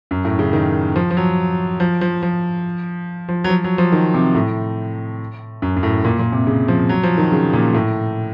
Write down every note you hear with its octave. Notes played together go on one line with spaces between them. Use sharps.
F#2
A2
C#3
D#3
F3
F3
F#3
F3
F3
F3
F3
F#3
F3
F#3
F3
D#3
C3
A2
F#2
F#2
A2
A#2
A#2
C3
C#3
F3
F#3
F3
D#3
C#3
A#2
A2